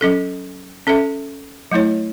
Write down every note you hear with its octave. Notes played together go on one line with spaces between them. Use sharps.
F#3 C#4 A4
C#4 A4 E5
F#3 A3 E4 C#5